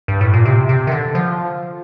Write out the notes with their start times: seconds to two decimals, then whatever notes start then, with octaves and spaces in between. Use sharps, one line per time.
0.08 G2
0.21 A2
0.33 A#2
0.45 C3
0.69 C3
0.87 D#3
0.92 D3
1.15 F3